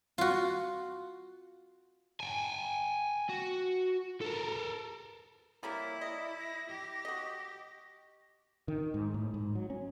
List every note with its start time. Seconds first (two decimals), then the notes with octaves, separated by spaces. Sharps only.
0.18 F4 F#4
2.20 G5 G#5
3.29 F#4
4.22 A4 A#4
5.63 F3 G3 A#3 E4 C#5
6.01 D5 D#5
6.39 A#6
6.70 G4
7.05 F#4 D#5
8.68 D#3
8.94 G#2
9.14 A2
9.34 G#2
9.55 F#3
9.70 C#4